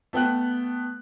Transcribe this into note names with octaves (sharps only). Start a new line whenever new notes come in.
A3 B3 G5 F#6